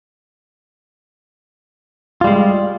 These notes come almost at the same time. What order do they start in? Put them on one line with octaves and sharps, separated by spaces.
F4 G3 G#3